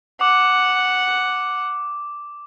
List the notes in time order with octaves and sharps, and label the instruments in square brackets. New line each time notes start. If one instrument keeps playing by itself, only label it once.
[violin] F#5 [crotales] D6